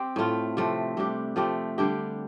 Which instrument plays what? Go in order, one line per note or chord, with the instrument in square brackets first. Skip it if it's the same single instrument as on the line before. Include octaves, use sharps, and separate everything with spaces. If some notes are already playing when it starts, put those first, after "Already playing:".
Already playing: [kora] C4 G4
A2 A3 F4
C3 F3 A3 C4
C3 G3 D4 G4
F3 A3 C4 G4
D3 G3 D4 G4